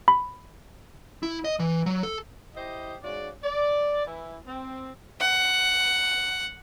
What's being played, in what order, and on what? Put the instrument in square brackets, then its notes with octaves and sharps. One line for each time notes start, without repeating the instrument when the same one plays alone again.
[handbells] B5
[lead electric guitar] E4
D#5
E3
F#3
A4
[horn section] E4 G4 C5 D#5
G#2 C#3 F#4 D5
D5
E3 E4
C4
[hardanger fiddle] F#5